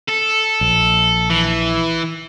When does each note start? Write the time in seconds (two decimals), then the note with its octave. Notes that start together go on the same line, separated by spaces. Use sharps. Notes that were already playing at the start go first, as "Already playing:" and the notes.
0.08 A4
0.61 A#1
1.30 E3